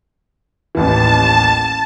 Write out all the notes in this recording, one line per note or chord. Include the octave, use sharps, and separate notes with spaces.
A1 D#2 E3 A5